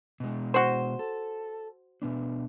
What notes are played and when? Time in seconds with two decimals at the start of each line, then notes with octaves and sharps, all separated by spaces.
0.20 B2 G#3
0.54 F#4 C5
0.99 A4
2.02 B2 B3 D4